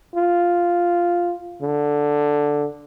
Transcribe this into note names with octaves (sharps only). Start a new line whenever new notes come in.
F4
D3